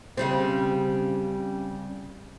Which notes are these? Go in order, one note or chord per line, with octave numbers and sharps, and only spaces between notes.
C#3 G3 C4